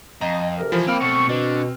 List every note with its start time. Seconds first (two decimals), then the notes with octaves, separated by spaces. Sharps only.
0.21 F2 D#5 A#5
0.57 D2 C3 A#4
0.72 E3 F3
0.87 A#3 C4 G5 B5 F6
1.01 B2 A3 C#6
1.29 B2 D3